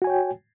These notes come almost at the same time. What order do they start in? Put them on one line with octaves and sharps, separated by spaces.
F#4 G#5 C#5 G5